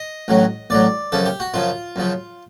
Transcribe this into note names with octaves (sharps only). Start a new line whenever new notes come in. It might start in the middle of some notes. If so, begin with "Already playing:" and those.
Already playing: D#5
A1 A2 F#3
A1 A2 F#3 D5
F#2 C#3 F3 A4
G4
F#4
F#2 C#3 F3 F4
F#2 C#3 F3